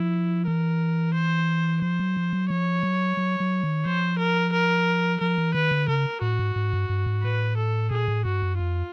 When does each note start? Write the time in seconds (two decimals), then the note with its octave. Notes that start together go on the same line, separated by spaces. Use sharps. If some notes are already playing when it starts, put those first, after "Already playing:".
Already playing: F3 E4
0.47 E3 A#4
1.15 C5
1.82 F3 C5
1.99 F#3
2.17 F3
2.33 F#3
2.50 F3 C#5
2.83 F#3
3.17 F#3
3.40 F#3
3.63 D#3
3.85 F3 C5
4.19 A#4
4.53 A#4
5.21 F3 A#4
5.38 E3
5.54 D#3 B4
5.71 D3
5.88 C#3 A#4
6.21 A2 F#4
6.39 G#2
6.56 G#2
6.73 G2
6.89 G2
7.06 G#2
7.24 A2 B4
7.57 A4
7.91 A#2 G#4
8.08 A2
8.25 G2 F#4
8.42 F#2
8.59 F2 F4